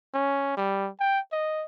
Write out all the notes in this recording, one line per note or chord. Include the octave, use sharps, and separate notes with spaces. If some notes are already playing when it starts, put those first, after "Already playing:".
C#4
G3
G5
D#5